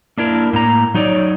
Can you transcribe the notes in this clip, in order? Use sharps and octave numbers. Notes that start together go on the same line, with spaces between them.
A#3 D4 E4 A#4
A2 A#3 A#5
F#3 D#4 C#5 D5